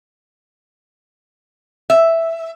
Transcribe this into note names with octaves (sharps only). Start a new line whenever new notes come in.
E5